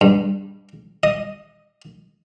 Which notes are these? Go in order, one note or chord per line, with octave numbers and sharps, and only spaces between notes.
G2
D#5